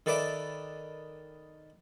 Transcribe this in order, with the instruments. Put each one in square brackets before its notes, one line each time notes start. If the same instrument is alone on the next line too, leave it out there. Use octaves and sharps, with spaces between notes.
[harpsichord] D#3 A4 B4 D5 E5 D6